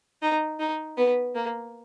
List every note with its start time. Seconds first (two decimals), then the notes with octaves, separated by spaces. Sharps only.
0.22 D#4
0.59 D#4
0.97 B3
1.35 A#3